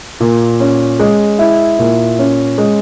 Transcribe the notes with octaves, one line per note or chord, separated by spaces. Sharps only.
A#2
C#4
G#3
E4
A#2
C#4
G#3